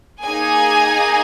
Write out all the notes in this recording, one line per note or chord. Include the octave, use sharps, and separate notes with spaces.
A#3 D#4 G#4 G#5